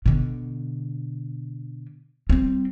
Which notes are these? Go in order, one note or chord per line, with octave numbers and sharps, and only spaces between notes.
B2 D3
G3 C4